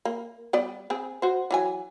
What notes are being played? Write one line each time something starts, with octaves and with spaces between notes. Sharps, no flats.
A#3
G3 B3 D5
C4 G#4
F#4 C5
E3 F#3 G#5